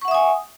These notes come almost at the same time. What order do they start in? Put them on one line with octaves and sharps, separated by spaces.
C#6 F#5 E5 D#6 G#5